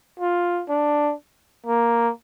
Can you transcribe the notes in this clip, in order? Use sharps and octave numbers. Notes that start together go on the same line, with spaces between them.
F4
D4
A#3